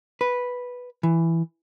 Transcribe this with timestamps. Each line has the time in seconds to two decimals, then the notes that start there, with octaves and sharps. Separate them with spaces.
0.21 B4
1.03 E3